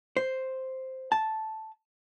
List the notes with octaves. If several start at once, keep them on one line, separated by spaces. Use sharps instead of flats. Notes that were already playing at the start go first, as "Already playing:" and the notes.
C5
A5